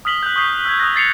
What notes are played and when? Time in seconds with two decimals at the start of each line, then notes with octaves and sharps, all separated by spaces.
0.05 D#6 F6 B6 F#7 G7
0.23 F#6 G6
0.36 C#6 D#6 G6 C7
0.65 E6 F#6 G#6
0.79 D#6 F6 F#6 A#6
0.96 A6 C7 C#7 F7